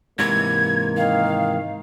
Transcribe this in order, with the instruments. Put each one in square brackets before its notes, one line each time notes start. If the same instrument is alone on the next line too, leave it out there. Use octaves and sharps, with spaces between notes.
[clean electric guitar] G#2 C3 E3 [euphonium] A#3 [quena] G#6
[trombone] D#3 [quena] F5